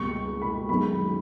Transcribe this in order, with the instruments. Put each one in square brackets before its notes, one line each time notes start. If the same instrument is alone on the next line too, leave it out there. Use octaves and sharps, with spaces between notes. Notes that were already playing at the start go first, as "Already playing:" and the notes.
Already playing: [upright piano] C#2 B2 G3 A#3 C#6
B5
F#2 D#3 G#3 B3 B5